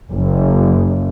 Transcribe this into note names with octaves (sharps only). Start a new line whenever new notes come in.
F#1